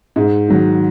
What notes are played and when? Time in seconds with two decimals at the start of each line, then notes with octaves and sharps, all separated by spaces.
0.16 G#2
0.48 D#3 F#3